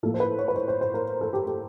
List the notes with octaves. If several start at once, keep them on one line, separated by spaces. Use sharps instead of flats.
A2 F3 A#3 A4
C5
B4
C#5
B4
C5
C5
C5
A#4
A4
G4
G4